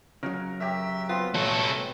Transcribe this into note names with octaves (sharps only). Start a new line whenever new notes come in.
C#3 E3 F#3 A#4
F#2 G4 E5
B3 C4 F4
C2 A3 C#4 A4